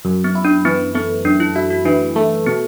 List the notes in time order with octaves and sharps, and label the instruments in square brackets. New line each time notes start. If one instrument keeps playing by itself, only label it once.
[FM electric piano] F#2
[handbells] B3
[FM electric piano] E4
[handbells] D4
[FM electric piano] E3 [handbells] B3
[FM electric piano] A3 [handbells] B3
[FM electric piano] F#2 [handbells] D4
[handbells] E4
[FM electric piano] E4 [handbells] F#4
[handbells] F#4
[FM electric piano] E3 [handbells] D4
[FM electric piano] A3
[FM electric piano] B2 [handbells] B3